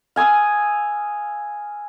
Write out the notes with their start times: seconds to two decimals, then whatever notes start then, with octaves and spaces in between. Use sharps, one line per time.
0.16 F5 G#5 D#6 E6